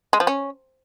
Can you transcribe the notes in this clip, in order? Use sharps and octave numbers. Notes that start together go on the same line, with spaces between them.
G#3
F3
C#4